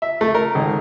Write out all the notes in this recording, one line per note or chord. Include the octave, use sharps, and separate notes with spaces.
E5
A3
A#4
G#1